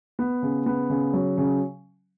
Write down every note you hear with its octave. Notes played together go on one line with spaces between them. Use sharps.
B3
C#3
B3
C#3
F#3
C#3